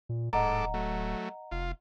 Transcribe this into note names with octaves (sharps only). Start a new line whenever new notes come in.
A#2
D1 G#2 A4 D#5 F#5 A#5 D6
F#3 A3
F1 F4